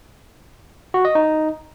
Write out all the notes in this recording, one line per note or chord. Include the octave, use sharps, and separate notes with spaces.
F#4
D#5
D#4